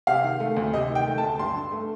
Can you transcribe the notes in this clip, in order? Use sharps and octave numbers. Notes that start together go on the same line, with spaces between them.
C3 F5
D#3
A3
D2
C3 D#5
D#3
G5
A3
A5
D2
G2 C6
D3
A3